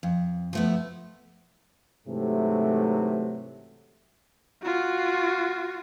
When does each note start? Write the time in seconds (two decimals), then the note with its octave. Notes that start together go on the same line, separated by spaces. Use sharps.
0.03 F2
0.53 F3 A3 B3
2.07 G#2 C3 E3 F#3 A3
4.62 F4 F#4